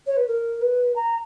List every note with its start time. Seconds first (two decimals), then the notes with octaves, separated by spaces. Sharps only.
0.07 C#5
0.17 B4
0.27 A#4
0.61 B4
0.96 A#5